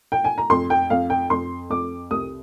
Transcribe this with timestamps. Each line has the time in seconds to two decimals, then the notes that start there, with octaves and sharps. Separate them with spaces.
0.12 G5
0.24 G#5
0.38 A#5
0.50 F2 C6
0.70 G5
0.90 F2 F5
1.10 G5
1.30 F2 C6
1.70 F2 D6
2.11 C2 D#6